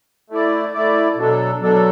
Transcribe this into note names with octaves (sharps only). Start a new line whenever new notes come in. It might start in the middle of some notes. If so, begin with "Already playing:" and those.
A3 E4 D5
A3 E4 D5
B2 F#3 D4 A4
B2 F#3 D4 A4